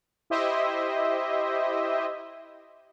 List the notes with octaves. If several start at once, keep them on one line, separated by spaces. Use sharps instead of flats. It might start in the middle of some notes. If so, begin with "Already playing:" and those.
E4 G4 C5 D#5 E5